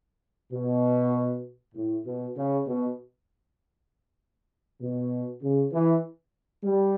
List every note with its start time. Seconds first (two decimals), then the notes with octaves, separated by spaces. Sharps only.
0.52 B2
1.74 A2
2.05 B2
2.36 C#3
2.66 B2
4.80 B2
5.41 C#3
5.72 E3
6.63 G3